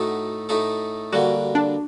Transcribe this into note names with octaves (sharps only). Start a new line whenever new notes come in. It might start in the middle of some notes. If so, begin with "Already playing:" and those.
Already playing: A2 A3 D#4 F#4 A4
A2 A3 D#4 A4
D3 G3 A#3 F#4
D4